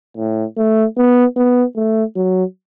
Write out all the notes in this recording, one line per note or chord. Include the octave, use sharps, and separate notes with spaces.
A2
A3
B3
B3
A3
F#3